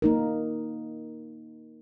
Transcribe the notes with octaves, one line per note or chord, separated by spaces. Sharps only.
A#3 D#4 A#4